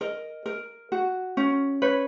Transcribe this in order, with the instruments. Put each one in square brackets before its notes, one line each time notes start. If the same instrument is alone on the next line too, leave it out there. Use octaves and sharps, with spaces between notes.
[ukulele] A#4 D#5
A#4
F#4
C#4
B4 C#5